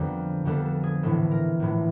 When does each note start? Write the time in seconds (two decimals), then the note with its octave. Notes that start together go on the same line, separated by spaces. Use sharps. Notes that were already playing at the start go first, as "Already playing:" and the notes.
Already playing: F2 D3 G3 B3 A#4
0.45 F2 D3 G3 B3 A4
0.66 A4
0.84 G#4
1.03 A#1 A2 E3 A4
1.31 A#4
1.60 A#1 A2 E3